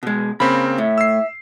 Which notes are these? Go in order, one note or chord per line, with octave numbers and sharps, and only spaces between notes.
B2 G#3
C#3 A#3 C4 B5
A2 E5
E6 C7